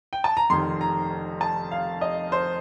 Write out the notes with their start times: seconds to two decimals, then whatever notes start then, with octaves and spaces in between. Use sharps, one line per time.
0.13 G5
0.24 A5
0.37 A#5
0.50 F1 F2 D#3 C6
0.81 A#5
1.41 A5
1.71 F5
2.01 D#5
2.32 C5